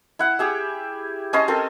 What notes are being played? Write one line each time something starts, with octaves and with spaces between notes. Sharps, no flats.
E4 F#5
G4 G#4 E5
C#4 D#5 A5 C6
C4 A4 A#4